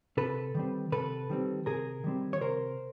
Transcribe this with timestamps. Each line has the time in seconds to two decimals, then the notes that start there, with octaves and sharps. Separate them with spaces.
0.17 C3 A4 B4
0.55 D#3 G3 C4
0.92 C3 A4 B4
1.30 D#3 G3 C4
1.66 C3 G#4 A#4
2.04 D#3 G3 C4
2.33 C#5
2.41 C3 A#4 C5